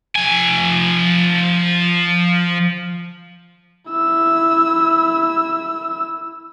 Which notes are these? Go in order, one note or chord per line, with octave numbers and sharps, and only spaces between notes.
F3 G#5
E4 E6